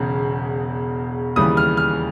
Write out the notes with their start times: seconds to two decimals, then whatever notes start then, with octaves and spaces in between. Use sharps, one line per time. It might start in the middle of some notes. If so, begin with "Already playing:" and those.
Already playing: E1 E2 C#3
1.36 D#2 C#3 E3 G3 D#6
1.57 F6
1.77 F6